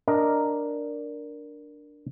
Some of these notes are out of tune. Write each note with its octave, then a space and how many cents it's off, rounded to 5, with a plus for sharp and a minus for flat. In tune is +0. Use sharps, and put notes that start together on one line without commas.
D4 +0 A#4 +0 D#5 +5